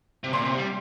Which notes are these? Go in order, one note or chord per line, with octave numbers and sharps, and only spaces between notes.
C3
A#2 C6
C3
G3